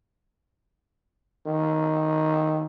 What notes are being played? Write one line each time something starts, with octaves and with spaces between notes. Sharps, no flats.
D#3